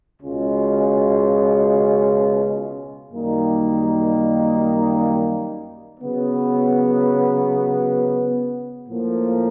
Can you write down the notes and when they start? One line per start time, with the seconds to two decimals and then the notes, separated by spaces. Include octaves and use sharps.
0.21 C#2 B2 G#3 C#4 F4
3.10 F#2 D#3 G3 A#3 D#4
6.00 C#3 F#3 B3
8.88 A2 F3 A#3